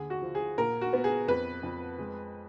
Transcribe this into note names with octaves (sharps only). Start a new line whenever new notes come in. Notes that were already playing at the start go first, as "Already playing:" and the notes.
Already playing: D#2 D3 G#4
F#4
F3
G#4
A#2 A#4
F#4
B3
G#4
F2 B4
F2
G#3